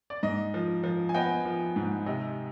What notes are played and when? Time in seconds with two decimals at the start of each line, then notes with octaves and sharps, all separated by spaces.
0.10 D5
0.23 G#2 D#5
0.54 F3
0.84 F3
1.09 G#5
1.14 B3 D#5 G5
1.45 F3
1.76 G#2
2.06 C3 D#5